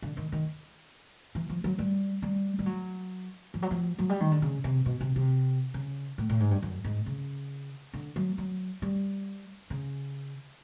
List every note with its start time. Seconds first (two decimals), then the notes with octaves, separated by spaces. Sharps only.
0.02 D3
0.17 D#3
0.32 D#3
1.35 E3
1.50 F3
1.64 F#3
1.78 G3
2.22 G3
2.59 G3
2.66 F#3
3.54 F3
3.62 F#3
3.71 F3
3.98 F#3
4.09 G3
4.20 D#3
4.31 D3
4.42 C#3
4.64 C3
4.86 B2
5.01 C3
5.16 C3
5.74 C#3
6.18 A2
6.29 A2
6.40 G#2
6.51 G2
6.62 F#2
6.85 G#2
7.06 C#3
7.93 D3
8.16 F#3
8.38 F#3
8.82 G3
9.70 C#3